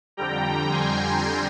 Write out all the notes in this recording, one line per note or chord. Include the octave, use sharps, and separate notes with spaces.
F2 D3 G3 G5 A#5
G#5 C6